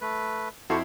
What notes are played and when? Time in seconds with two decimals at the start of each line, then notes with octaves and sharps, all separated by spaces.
0.01 A3 B4
0.70 F2 E4 F#4 A4 C5 C#6 C7